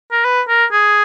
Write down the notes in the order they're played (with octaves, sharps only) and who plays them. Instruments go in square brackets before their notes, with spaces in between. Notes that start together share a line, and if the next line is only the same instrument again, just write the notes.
[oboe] A#4
B4
A#4
G#4